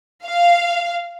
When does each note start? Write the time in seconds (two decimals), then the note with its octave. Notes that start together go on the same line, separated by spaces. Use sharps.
0.25 F5